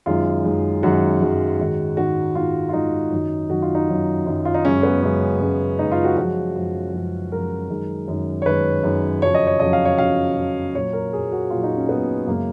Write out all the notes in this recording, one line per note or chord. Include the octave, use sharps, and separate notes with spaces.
F#2 D#3 G#3 F4
F#2 D#3 G#3
F#2 D#3 G#3 F#4
F#2 D#3 G#3
G#2 D#3 G#3
G#2 D#3 G#3 F#4
G#2 D#3 G#3 F4
F4
G#2 D#3 G#3 D#4
F#2 D#3 F#3
F#2 D#3 F#3 F#4
F4
D#4
F#2 D#3 F#3
F#2 D#3 F#3
F4
D#4
F#2 C#3 G#3 C#4
B3
F#2 C#3 G#3
F#2 C#3 G#3
F#2 C#3 G#3 D#4
F4
F#4
F#2 F3 G#3 F#4
F#2 F3 G#3
F#2 F3 G#3
F#2 F3 G#3 A#4
F#2 D#3 G#3
F#2 D#3 G#3
C#5
F#2 D#3 G#3 B4
F#2 D#3 G#3
F2 C#3 F#3 C#5
D#5
C#5
F2 C#3 F#3 D#5
F5
C#5
F2 C#3 F#3 F5
F2 C#3 F#3
A#2 F#3 C#5
A#4
A#2 F#3 G#4
F#4
A#2 F#3 F4
D#4
C#4
A#2 F#3 B3
F#2 C#3 G#3 A#3